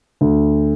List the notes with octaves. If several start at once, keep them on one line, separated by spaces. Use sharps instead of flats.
D2